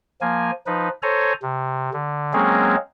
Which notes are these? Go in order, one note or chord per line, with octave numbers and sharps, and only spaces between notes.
F3 A#3 G#5
F3 D#4 B4
A4 C5 C#5 G#5 A#5
C3
D3
F#3 G#3 A#3 C4 C#4 G#4